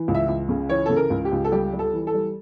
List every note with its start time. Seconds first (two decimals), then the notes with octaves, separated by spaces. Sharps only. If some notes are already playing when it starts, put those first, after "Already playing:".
Already playing: E3
0.08 C#2
0.15 E5
0.28 C#2
0.49 C#3
0.69 E3 C#5
0.86 C#3 A4
0.96 A#4
1.10 C#2
1.25 G4
1.32 C#2
1.44 A4
1.52 G3 G4
1.73 G3
1.79 A4
1.93 E3
2.07 A4
2.14 G3